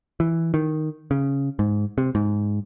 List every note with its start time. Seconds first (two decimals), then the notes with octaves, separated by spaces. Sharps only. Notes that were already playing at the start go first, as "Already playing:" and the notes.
0.20 E3
0.54 D#3
1.11 C#3
1.59 G#2
1.98 C3
2.15 G#2